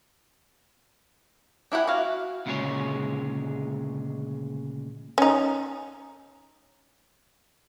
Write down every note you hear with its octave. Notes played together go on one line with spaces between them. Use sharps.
D4 E4 G4 F#5 G#5
F#4 F5
D2 A#2 C#3 G#3 G#4 C#5
C#4 D#4